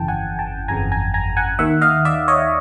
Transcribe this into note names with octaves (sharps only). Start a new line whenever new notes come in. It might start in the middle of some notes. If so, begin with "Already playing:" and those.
Already playing: G1 F2 C#3 E3 G5 A5
F#5 G#5
G5 A5
G1 F2 C#3 E3 G#5 A#5
G#5 A#5
G#5 A#5
F#5 G#5
D#2 D#3 E5 F#5
D#5 F5
D5 E5
C#5 D#5